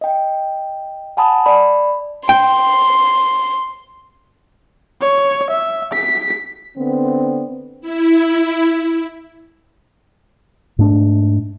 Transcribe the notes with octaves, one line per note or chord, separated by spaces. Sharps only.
D#5 G5
F#5 G#5 A5 B5 D#6
D5 B5
G5 C6
C#5
E5
B6
D3 B3 C4
E4
G#2 A3 D4